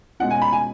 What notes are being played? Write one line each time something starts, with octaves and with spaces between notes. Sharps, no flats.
B2 G#3 C#4 F#5
G#5
B5
G#5